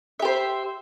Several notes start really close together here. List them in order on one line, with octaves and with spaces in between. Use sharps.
E5 G4 C5